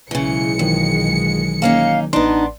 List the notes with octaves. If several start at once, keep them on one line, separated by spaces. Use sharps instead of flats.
B1 C#3 E3 G#3 C#7
F2 D#3 E3 F#3
A#3 C#4 D#4 F5
A1 B3 D4 D#4 C6